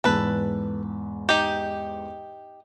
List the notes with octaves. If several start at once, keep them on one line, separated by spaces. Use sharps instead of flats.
E2 G#2 B3 A4 B4
D#4 G4